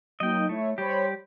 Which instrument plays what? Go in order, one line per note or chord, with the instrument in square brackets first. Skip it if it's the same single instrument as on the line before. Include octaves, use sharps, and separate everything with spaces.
[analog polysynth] F#3 A#3 D#4 [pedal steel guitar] D#5 G5
[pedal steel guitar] A3 [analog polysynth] E4 C#5
[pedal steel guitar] G3 G4 [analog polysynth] C5 C#5 B5